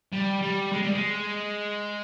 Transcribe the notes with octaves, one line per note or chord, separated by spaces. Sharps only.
G3
G3
G#3
G3
G#3